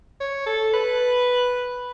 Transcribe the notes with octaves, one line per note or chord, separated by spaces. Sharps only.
C#5
A4
B4